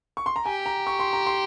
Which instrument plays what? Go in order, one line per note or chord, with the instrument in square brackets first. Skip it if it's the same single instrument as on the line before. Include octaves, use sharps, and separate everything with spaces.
[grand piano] C#6
C6
A#5
[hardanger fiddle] G4 [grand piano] G#5
[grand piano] A#5
C#6
C6
A#5
C6